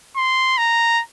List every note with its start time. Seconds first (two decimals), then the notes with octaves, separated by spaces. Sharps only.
0.16 C6
0.58 A#5